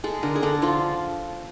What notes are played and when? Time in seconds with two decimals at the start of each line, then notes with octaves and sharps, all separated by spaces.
0.04 G#3 A4
0.23 D3 A#4
0.36 G#4
0.42 D3 A4
0.62 F3 F4